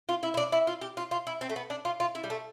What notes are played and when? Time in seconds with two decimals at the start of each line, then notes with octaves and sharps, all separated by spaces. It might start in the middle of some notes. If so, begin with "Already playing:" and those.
0.09 F4
0.23 E4
0.34 E4
0.37 D4
0.52 E4
0.67 F4
0.81 G4
0.97 F4
1.11 F4
1.27 E4
1.41 C4
1.50 A3
1.56 B3
1.70 D4
1.85 F4
2.00 F4
2.15 E4
2.24 G3
2.30 A3